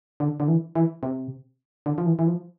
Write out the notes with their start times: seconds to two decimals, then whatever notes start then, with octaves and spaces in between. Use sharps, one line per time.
0.20 D3
0.40 D3
0.48 E3
0.75 E3
1.03 C3
1.86 D3
1.98 F3
2.06 E3
2.19 E3
2.27 F3